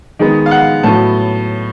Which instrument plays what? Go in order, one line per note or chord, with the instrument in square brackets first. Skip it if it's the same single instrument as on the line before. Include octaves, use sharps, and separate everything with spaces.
[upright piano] D#3 G#3 B3
F5
F#5
A2 F#3 B3 A5